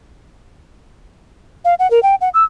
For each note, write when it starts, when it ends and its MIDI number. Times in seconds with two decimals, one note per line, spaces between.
1.65 1.74 77
1.79 1.90 78
1.91 2.02 70
2.03 2.15 79
2.21 2.29 78
2.34 2.44 88